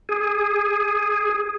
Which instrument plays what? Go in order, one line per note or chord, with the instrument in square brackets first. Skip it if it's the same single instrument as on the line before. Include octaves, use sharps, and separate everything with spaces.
[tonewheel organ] G#4